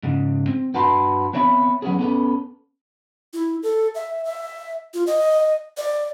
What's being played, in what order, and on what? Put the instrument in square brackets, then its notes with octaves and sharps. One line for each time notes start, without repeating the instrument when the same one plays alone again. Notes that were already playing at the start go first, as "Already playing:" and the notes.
[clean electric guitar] G#2 C#3
C4
G2 F#4 B4 A5 B5 C6
B3 C4 C#5 E5 A5 B5
F#3 B3 C#4 G#4
B3 C#4 A4 B4
[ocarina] E4
A4
E5
E5
F4
D#5
D5